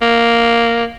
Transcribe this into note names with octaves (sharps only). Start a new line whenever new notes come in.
A#3